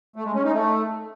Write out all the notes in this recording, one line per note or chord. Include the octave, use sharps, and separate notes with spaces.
A3
G#3
C#4
D#4
A3